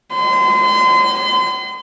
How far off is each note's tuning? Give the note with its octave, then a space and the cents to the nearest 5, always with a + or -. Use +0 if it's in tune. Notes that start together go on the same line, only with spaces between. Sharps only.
C6 -35